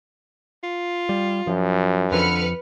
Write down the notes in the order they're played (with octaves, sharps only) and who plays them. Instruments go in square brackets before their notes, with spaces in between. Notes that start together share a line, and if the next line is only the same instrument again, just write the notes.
[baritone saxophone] F4
[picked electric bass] G3
[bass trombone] F#2 [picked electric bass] F3
[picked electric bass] F2 F3 [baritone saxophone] D3 [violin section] B4 F6 C#7